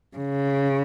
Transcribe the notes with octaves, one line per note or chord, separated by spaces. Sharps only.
C#3